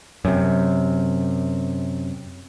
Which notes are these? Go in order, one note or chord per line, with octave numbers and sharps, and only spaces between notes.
F#2 C3